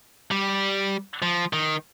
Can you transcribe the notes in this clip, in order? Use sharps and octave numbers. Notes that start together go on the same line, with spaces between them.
G3
F3
D#3